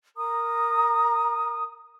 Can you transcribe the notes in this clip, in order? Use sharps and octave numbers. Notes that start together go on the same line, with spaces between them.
A#4 A#5 D#6